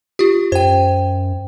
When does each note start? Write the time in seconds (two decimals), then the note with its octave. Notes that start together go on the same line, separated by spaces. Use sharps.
0.19 F4 G4
0.52 F#2 C5 G5